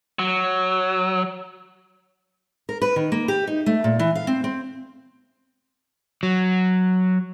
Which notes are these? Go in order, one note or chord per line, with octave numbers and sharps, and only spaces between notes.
F#3
A#4
B4
D#3
A#3
G4
D#4
A3
A#2
E3
F5
C4
C4
F#3